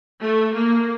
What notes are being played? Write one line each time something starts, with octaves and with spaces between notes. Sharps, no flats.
A3
A#3